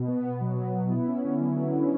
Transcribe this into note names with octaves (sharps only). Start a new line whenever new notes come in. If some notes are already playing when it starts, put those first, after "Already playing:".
Already playing: B2
B3
B2
F#3
B2
B3
E4
C#4
D3
F#3
E4
C#4